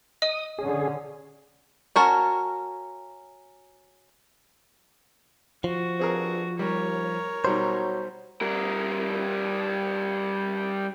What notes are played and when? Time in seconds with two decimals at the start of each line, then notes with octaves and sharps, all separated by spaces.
0.22 D#5 D#6
0.59 D3 C#4 G#4
1.96 C#4 F#4 A#4 A5
5.64 F3 F#4
5.99 G2 C4 G#4 A#4
6.59 D#2 G3 A#4 C#5
7.45 B2 F#3 G3 D#4 C5
8.41 G3 A#4